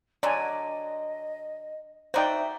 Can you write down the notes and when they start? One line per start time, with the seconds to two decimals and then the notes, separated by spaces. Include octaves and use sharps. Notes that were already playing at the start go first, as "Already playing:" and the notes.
0.23 D3 F#3 D5 D#5 G#5
2.14 D#4 F#4 C5 D5 E5 G5